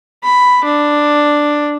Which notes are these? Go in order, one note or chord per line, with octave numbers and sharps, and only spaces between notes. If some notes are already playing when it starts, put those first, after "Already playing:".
B5
D4